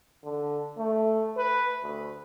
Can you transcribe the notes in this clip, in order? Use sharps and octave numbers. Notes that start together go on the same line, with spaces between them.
D3
A3
B4
D2